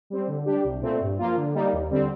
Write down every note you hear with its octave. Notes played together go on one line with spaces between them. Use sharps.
G3 C4
D3
G3 D4 G4
C2
A#2 A3 C4
G2
F3 A#3 F4
D3
G3 A#3 D#4
D#2
D3 G3 C4